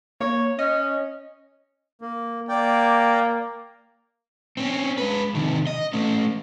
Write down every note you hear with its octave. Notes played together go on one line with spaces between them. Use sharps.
A#3 C#5
C#4 D#5
A#3
A#3 D5 G5
C4 C#4
G#3 B4
C3 D#3
D#5
A3 C#4